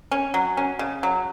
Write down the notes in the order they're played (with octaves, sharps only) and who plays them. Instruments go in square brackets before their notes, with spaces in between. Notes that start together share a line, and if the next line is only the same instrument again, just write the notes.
[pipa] C#4
F#3
C#4
C#3
F#3